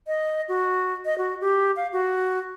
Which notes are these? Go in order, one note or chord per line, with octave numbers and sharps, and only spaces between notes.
D#5
F#4
D#5
F#4
G4
F5
F#4